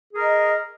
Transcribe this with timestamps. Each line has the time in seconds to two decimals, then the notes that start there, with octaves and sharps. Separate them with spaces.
0.13 G#4
0.17 A#4
0.22 D#5